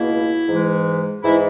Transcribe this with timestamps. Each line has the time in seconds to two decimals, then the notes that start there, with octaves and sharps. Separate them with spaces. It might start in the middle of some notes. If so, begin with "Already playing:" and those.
Already playing: C#2 B2 A#3 E4
0.48 G#2 E3 G#3
1.23 G#2 E3 G#3 E4